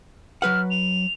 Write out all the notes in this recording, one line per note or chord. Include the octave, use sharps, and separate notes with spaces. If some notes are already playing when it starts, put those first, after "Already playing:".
F#3 B4 F#5 F6
F7